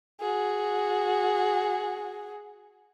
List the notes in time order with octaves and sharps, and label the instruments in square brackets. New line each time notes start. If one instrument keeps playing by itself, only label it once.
[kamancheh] F#4 G#4